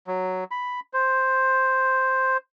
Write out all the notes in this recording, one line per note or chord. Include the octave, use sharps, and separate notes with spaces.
F#3
B5
C5